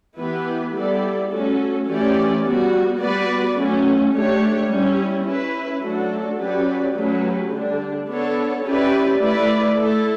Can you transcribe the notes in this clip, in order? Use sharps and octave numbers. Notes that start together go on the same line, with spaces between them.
E3 B3 E4 G4 B4
G3 B3 E4 A4 D5
A3 C#4 F#4 A4
E3 A3 C#4 G4 D5
G3 B3 F#4
G3 B3 F#4 B4 D5
F#3 A3 C#4
A3 D4 G4 C#5
G3 C#4 E4
C#4 E4 B4
F#3 A3 D4 F#4 A4
F#3 C#4 G4 B4 D5
F#3 A3 C#4 G4 B4
D3 G3 D4
B3 D4 A4 C#5
C#4 E4 G4 B4 D5
A3 E4 B4 D5
A3 E4 A4